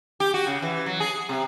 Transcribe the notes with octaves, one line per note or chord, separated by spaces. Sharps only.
G4
F#4
C#3
E3
F#3
G#4
C3